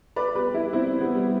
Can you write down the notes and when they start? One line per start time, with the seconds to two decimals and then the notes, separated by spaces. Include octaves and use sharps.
0.16 B4 D5
0.35 G4 B4
0.54 E4 G4
0.73 C4 E4
1.01 G3 B3
1.15 G3